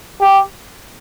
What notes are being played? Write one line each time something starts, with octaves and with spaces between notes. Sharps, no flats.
G4